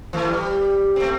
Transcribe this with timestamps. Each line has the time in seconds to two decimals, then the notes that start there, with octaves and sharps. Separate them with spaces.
0.13 E3 A3
0.28 G3
0.96 A3 C4